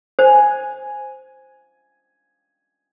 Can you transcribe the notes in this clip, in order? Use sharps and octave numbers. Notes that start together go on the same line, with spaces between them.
C5 G#5